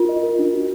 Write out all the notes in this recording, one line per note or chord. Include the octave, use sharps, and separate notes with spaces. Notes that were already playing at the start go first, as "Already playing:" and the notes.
Already playing: F4 A#4
D#5
A#4
D4
F#4